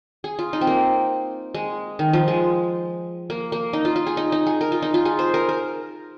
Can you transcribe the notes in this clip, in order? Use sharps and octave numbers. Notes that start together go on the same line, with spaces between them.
G#4
F4
D#4
C4
A#3
G#3
D#3
F3
G#3
A#3
A#3
D#4
F4
F4
G#4
D#4
D#4
G#4
A#4
F4
D#4
F4
G#4
C5
A#4
A#4